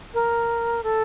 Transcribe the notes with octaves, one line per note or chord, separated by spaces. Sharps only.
A#4
A4